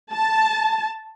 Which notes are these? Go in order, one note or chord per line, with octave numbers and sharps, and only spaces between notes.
A5